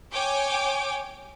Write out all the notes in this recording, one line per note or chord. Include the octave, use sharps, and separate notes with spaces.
C#5 G5 G#5 D6